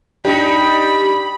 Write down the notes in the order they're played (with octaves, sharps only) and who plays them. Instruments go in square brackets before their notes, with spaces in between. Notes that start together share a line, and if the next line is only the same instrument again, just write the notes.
[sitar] G3 D#4 [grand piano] D4 [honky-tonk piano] G4 [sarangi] B5